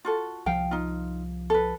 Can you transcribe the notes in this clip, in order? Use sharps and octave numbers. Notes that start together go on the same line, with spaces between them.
F4 F#4 A4
C2 F3 F5 G5
D#4 F4
A4 B4